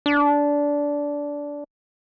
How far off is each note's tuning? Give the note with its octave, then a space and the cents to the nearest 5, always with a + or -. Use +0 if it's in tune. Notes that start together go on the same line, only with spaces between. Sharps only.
D4 -15